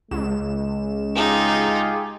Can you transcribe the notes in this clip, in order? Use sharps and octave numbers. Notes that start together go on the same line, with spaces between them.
C#2 G#3 E7
D#4 F4 G4 G#4